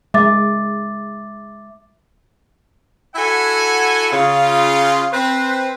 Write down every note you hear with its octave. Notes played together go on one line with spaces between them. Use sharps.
G#3 E5 D6 A6
E4 F#4 A4 E5 F#5 G#5
C#3 F4
C4 B4 C5